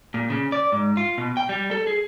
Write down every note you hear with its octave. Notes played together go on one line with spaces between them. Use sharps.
A#2
C#3
D5
G#2
F4
B2
G5
G3
A4
G#4